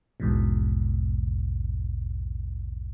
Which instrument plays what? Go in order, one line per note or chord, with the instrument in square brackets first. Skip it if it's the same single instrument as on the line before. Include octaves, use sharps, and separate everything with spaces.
[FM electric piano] A#1 E2 G#2 B2